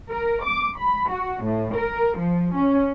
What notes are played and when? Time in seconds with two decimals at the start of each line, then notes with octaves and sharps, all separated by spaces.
0.11 A#4
0.45 D6
0.80 B5
1.11 F#4
1.44 A2
1.76 A#4
2.19 F3
2.55 C#4